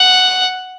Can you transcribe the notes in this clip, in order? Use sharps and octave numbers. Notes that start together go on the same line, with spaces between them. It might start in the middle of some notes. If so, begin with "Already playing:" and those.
Already playing: F#5